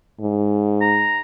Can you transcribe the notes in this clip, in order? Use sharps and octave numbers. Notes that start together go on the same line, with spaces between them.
G#2
A#5